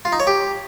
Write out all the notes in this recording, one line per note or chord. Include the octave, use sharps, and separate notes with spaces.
F4
D#4
C#5
G4